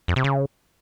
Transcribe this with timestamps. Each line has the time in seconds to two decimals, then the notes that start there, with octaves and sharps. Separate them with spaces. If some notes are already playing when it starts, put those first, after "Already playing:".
0.08 F2
0.16 C3
0.24 C#3